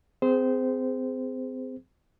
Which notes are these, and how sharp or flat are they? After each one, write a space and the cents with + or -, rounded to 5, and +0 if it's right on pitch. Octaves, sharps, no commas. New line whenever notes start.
C4 -30 G#4 +0 C5 -15